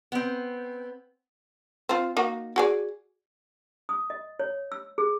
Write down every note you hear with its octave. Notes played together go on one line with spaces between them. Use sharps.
B3 C4
C4 F4
A#3 D#4 F#4
F#4 G#4 D5
D#6
D#5
C#5
E6
G#4